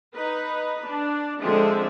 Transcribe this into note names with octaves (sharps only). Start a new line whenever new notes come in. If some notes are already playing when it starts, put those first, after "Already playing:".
D#4 B4
D4
D3 F3 G#3 C4 D4 E5